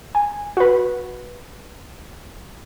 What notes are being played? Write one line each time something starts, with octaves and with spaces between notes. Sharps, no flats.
G#5
F#4 B4